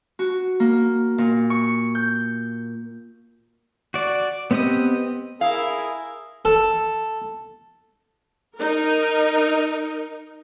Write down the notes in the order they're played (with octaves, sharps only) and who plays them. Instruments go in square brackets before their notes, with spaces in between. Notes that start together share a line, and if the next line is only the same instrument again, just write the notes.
[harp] F#4
A#3
A#2
C#6
G6
[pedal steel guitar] F#4 D5
B3 C4 G4 D#5 D#6
[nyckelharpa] E4 A#4 [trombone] G#4 [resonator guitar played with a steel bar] F5
[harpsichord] A4
[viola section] D#4 A#4